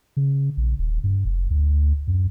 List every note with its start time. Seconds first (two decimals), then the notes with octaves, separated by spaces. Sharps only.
0.17 C#3
0.57 A#1
0.79 D#1
1.04 G2
1.25 F1
1.50 D2
2.07 F#2